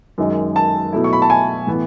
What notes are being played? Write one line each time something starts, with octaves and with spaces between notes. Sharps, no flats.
F#2 D#3 G#3 D#4
A5
B2 F#3 A3 E4
C#6
B5
A5
G#5
A2 E3 B3 E4